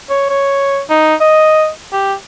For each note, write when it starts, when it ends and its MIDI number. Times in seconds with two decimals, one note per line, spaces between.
0.10 0.27 73
0.29 0.81 73
0.90 1.15 63
1.21 1.69 75
1.93 2.14 67